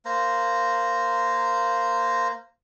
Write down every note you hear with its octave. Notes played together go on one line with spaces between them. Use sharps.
A#3 C5 A#5